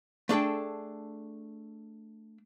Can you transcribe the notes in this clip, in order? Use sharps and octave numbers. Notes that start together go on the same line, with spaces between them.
A3 D4 G#4 A4 G5